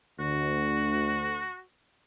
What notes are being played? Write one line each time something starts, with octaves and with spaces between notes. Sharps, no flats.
D2 F#4